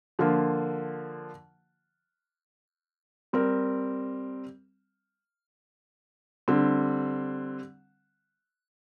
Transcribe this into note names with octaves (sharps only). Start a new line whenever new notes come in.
D3 F3 A#3 F4
G3 C4 A#4
D3 G3 C4